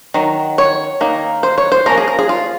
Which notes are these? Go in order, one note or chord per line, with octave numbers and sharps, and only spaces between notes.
D#3 F#3
C#5
D#3 A#3 D#4
C5
C#5
C5
F3 A#3 C#4 A#4
G#4
A#4
G#4
F4